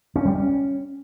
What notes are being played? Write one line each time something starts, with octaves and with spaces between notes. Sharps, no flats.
C#4
G3
C#4